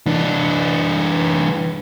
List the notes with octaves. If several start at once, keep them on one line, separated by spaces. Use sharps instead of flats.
E3 D4